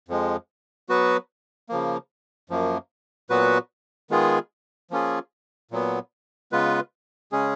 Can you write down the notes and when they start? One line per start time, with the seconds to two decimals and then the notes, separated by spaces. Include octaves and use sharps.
0.08 F2 F3 G#3
0.89 F#3 B3 F#4 B4
1.69 C#3 F3 A#3
2.50 F#2 F3 A#3
3.30 A#2 F#3 B3 F#4 B4
4.10 D#3 G#3 B3 F4 G#4
4.91 F3 A#3 C#4 F4 G#4
5.71 A#2 F#3 B3
6.52 C#3 G#3 B3 F4 B4
7.32 C#3 G#3 C#4 G#4